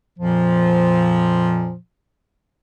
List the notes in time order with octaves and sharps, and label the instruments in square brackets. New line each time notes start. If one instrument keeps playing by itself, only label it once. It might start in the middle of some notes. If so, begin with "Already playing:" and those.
[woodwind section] F2 A#2 F3